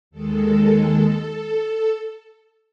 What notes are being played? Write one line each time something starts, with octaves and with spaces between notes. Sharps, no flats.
D#2 D#3 G#3 A4